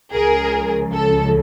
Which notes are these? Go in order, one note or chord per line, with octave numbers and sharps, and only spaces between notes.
C#2 C#3 F3 G#4 A#4
A4